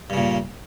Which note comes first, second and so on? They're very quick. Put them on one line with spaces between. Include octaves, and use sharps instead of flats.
G2 C#3 A#2